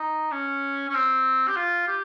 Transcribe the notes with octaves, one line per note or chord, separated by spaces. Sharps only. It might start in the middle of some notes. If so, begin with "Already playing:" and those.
Already playing: D#4
C#4
C#4
C4
G4
F4
G4